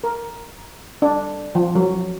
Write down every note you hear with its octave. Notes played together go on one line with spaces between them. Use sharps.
A#4
D4
F3
F#3